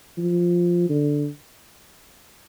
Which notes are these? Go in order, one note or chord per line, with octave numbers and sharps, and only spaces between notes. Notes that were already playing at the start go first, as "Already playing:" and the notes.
F3
D3